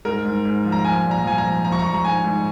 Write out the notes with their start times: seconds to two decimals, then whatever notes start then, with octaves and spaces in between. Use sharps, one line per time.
0.05 G#2 A#4
0.25 G#2
0.45 G#2
0.65 F3
0.72 A#5
0.85 F3 G#5
1.04 A#2
1.11 A#5
1.24 F3 G#5
1.38 A#5
1.44 F3
1.65 F3 A#5
1.72 C#6
1.79 A#5
1.84 F3 C#6
1.94 A#5
2.04 G#2 G#5
2.24 G#2